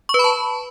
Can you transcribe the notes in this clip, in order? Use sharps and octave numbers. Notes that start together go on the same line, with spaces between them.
C#6
B4
B5
A5